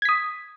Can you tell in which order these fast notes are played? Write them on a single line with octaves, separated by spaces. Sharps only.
G#6 B6 D#6